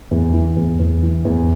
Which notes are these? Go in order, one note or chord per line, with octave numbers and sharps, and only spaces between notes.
E2
E3
E2
E2
E3
E2